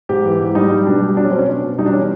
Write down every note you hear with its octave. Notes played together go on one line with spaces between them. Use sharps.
G#2 G4
E3
G#2
G3 D#4
G3
B2 D4
G3
F#3 D4
C#4
B2 C4
C#4
B2 D4
B2
G3 D#4
D4
E3 C#4